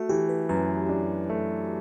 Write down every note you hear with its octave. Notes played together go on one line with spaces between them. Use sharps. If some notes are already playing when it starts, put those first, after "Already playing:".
Already playing: A3 F#4
E3 G4
B4
F#2 B4
D4
A3